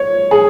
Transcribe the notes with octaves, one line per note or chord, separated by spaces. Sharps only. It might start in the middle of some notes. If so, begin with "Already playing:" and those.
Already playing: C#5
G#4